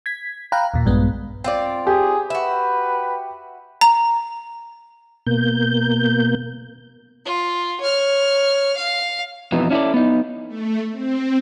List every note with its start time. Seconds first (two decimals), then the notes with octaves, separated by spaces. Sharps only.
0.06 G#6 B6
0.52 F5 G5 A#5 B5 F#6
0.74 D#2 A#2
0.86 A#1 G2 G#3 B3
1.44 C4 F4 D5
1.87 G4 G#4
2.30 F#4 B4 E5
3.81 A#5
5.27 B2 A#3 G6
7.25 F4
7.81 C#5 F6
8.76 F5
9.52 F2 B2 E3 D#4
9.70 C#4 D4 E4 G4 A4 D5
9.94 B3 D#4
10.48 A3
10.92 C4